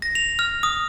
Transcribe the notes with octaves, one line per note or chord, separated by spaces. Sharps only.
A#6
F7
F6
D#6